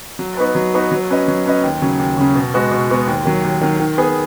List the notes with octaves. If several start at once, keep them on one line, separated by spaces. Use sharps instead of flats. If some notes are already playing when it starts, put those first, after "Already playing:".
F#3
B3 D#4 F#4 B4
F#3
B3 D#4 F#4 B4
F#3
C#4 B4 D#5
F#3
C#4 B4 D#5
D#2
C#3 F#3 C#4
D#2
C#3 F#3 C#4
B2
G#3 B3 F#4
B2
G#3 B3 F#4
D#2
D#3 F#3
D#2
D#3 F#3
D#3
B3 G#4